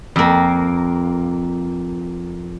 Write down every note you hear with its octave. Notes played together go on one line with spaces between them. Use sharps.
F2 A#3